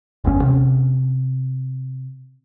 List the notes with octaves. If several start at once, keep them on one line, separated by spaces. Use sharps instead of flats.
G1 E2 C4 C#4
C3